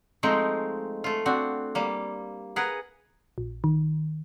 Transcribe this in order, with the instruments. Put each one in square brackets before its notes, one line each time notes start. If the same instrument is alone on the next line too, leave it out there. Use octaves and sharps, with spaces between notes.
[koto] F3 G#3 A3 C4 D#4
A3 F4
C4 D4 F#4
G3 A#3
G#4 A#4 B4 F#5
[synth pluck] A#1
D#3